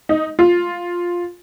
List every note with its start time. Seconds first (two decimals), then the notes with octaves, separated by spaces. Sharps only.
0.09 D#4
0.39 F4